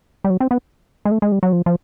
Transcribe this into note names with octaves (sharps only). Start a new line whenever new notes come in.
G3
F#3
C4
B3
G#3
A3
G#3
G3
F#3
F3
F3